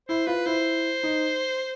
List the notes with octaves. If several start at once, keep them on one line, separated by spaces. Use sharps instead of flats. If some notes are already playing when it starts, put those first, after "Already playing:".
E4 C5
F4 B4
E4 C5
D#4